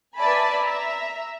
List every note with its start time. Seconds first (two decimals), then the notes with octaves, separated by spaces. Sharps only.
0.16 B4 D5 E5 G#5 A5 B5
0.61 E5 A#5